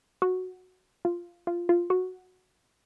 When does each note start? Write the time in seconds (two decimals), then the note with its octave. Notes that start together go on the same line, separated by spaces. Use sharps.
0.22 F#4
1.05 F4
1.47 F4
1.69 F4
1.90 F#4